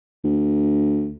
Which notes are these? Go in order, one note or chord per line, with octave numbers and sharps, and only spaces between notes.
D2